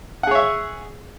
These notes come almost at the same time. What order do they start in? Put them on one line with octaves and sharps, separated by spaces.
F#5 G#4 C#5 E5